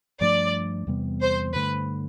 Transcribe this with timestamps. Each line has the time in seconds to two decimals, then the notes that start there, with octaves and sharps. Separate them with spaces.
0.21 G2 F3 A3 D4 D5
0.87 E2 C3 G3 B3
1.21 C5
1.54 G2 D3 A3 B4